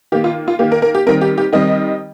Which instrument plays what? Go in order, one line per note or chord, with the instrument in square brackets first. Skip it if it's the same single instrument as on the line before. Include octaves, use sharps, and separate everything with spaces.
[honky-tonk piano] D#3 G4
A#3
F4
F4
D#3 A#3 G4
A#4
A#4
G4
D#3 G3 C4 A#4
G4
G4
D#3 G3 C4 D#5